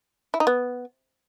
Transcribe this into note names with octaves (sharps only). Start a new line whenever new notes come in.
E4
D#4
B3